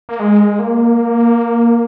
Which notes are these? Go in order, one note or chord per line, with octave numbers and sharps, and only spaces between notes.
A#3
G#3
A#3